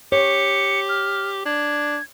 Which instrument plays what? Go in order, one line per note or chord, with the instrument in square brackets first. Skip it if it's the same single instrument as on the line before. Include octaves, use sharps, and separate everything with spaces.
[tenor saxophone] G4 [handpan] C#5 [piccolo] C#7
[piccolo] F6
[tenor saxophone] D4 [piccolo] G#6